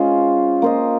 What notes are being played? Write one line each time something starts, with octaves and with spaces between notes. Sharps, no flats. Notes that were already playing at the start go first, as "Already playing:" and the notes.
Already playing: G#3 C#4 F4 C5
A#3 F4 C5 D#5